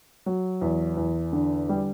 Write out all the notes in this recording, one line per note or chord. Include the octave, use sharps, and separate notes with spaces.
F#3
E2
E2
D3
G3